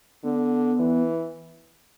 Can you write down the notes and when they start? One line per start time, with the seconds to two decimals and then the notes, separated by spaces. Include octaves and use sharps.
0.24 D3 B3
0.80 E3